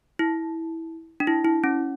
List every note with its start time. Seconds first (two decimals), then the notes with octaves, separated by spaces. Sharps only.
0.19 E4
1.20 D4
1.27 E4
1.45 E4
1.64 C#4